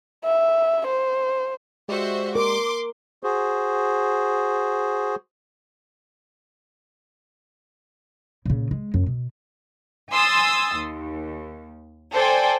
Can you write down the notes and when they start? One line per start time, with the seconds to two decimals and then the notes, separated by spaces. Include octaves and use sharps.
0.25 E5
0.86 C5
1.89 G#3 F#4 G4 C5 D5 E5
2.35 A#4 C6 D6
3.23 F#4 G#4 C5
8.46 A#2 C#3
8.71 G#3
8.94 F#2
9.06 B2
10.11 G#5 C6 D#6 E6 A6
10.76 D#2
12.14 A4 C5 D5 G5 G#5